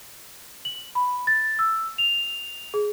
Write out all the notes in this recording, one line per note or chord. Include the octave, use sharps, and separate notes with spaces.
F#7
B5
A6
E6
F7
G#4